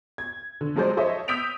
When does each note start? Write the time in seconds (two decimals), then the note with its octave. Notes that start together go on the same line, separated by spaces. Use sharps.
0.18 G#6
0.61 D3
0.76 F3 F#3 G#3 A4 C5 D5
0.97 A4 C5 C#5 D#5 E5
1.28 D#6 E6 G6 B6 D7 F7